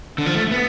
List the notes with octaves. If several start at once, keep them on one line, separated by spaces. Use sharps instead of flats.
D3
F3
A3
B3